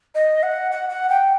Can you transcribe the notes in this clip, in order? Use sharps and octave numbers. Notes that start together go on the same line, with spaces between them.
D#5
F#5
F#5
F#5
G5